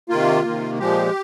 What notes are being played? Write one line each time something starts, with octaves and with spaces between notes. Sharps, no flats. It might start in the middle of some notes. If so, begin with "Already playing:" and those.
C3 D#3 A#3 F4
C3 D#3 A#3
A#2 F3 G#3 G4